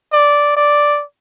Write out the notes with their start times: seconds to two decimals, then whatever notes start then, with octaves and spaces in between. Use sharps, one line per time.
0.13 D5
0.57 D5